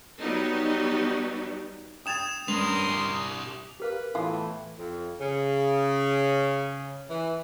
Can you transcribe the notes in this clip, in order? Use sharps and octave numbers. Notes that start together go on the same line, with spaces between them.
F#3 G3 B3 D#4
G5 D#6 G#6 A6 E7 F7
G2 C#4 A#4 B4 C6 D#6 F7
E4 G4
G4 A#4 B4 F5
A2 E3 B3 E4 F4
F2
C#3
E3